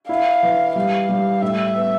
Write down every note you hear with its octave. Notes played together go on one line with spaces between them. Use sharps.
E4 F5
E3
G3 F5
G3
A2 E5
B3